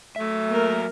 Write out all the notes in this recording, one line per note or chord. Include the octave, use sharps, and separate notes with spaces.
F#3 A3 E5
A#3 A#4